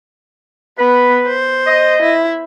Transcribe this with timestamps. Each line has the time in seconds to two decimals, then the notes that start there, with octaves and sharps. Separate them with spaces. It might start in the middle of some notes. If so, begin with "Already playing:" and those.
0.79 B3 B4
1.27 C5
1.67 D#5
2.02 E4